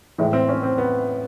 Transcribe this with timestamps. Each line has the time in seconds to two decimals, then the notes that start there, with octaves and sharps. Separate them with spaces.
0.18 A2 E3 G#3
0.33 C4
0.49 C#4
0.63 C4
0.78 B3